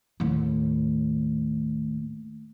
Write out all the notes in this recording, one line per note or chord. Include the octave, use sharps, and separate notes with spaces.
D#2 A2